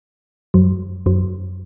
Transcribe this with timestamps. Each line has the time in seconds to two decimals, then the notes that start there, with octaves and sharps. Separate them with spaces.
0.54 F#2 F#3
1.06 F#2 F#3